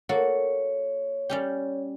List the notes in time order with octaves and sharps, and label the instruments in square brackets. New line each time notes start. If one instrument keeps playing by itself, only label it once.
[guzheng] A#3 F#4 A4 [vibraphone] C#5
[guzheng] G3 C#4 G4